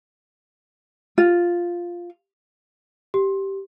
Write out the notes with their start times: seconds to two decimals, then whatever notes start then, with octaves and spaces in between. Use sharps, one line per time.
1.18 F4
3.14 G4